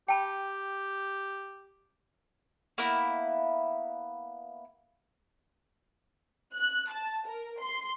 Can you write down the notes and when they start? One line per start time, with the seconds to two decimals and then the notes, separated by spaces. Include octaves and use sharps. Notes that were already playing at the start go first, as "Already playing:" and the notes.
0.08 G4 G5 A5 B5
2.78 A#3 B3 E4
6.55 F#6
6.91 A5
7.27 A#4
7.61 C6